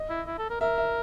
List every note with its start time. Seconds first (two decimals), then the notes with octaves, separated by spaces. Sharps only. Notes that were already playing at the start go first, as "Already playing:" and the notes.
Already playing: D#5
0.10 E4
0.27 E4
0.38 A4
0.50 A#4
0.61 A#4 E5
0.78 E5